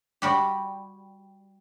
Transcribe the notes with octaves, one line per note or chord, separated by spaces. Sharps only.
G3 F#4 G4